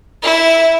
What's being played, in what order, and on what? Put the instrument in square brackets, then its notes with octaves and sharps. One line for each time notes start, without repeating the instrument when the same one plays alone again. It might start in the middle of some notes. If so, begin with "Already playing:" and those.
[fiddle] E4